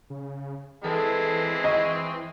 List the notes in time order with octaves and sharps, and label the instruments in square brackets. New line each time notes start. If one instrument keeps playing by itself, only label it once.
[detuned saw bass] C#3
[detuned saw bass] E3 [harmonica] G#3 C4 E4 [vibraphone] A4 B4 A5
[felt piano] D#5 [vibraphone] C#6